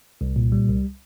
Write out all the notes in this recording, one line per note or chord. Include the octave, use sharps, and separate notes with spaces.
C2
A#2
G3
C2